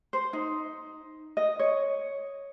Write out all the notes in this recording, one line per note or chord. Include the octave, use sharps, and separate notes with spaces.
C5
D#4
D#5
C#5